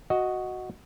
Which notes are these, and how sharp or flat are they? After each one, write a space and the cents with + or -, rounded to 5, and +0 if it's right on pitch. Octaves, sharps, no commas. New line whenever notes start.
F#4 +0 D#5 +0